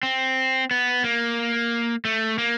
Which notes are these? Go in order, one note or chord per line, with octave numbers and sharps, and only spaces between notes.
C4
B3
A#3
A3
A#3